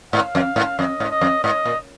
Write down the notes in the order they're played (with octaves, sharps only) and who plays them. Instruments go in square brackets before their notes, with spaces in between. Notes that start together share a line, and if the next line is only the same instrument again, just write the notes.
[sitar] G#2 [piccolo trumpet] F5
[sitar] F2
G#2
[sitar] F2 [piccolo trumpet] D#5
[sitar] G#2
[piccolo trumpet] D#5
[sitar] F2
[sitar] G#2 [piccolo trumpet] D#5
[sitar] A#2